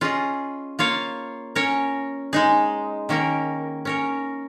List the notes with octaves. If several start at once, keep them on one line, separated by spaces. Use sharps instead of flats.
C#4 F4 G#4 D#5
A#3 F4 C#5 F5
C#4 A#4 C#5
G#3 D#4 G#4
D#3 A#3 C#4 A#4
C#4 A#4 C#5